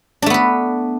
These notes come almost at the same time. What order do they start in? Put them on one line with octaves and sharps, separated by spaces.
D4 A3 B3 B4